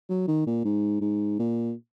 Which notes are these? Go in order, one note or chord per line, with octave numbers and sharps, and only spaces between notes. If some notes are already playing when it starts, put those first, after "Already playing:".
F#3
D#3
A#2
G#2
G#2
A#2